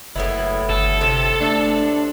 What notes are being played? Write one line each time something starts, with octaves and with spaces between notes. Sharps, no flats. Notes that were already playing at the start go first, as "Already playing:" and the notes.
F#1 A2 B3 E4
G1 A4
A2 C3
A3 D4